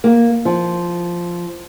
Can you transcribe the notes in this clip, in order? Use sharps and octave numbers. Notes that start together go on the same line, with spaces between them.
A#3
F3